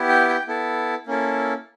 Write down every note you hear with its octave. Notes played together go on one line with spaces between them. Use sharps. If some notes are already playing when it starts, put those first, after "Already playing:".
Already playing: B3 E4 G4
G5
G5
B3 E4 A4
A#3 C#4 E4 A4